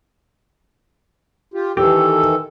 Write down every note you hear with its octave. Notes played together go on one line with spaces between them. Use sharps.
F4 G4
D#3 E3 G4 A4